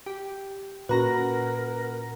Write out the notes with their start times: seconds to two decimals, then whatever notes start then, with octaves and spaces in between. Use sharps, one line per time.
0.06 G4
0.89 A#2 C#4 F#4 A#4 B4 F#5 A#5 A#6